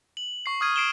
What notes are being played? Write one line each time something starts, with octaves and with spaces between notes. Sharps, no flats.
F#7
C#6 C7
C#6 D#6 F6 G#6 D#7
C7 D7 E7 G7